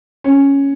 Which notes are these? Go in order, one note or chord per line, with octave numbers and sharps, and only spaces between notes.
C#4